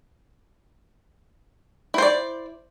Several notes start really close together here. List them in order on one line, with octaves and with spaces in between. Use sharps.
E4 C5 D5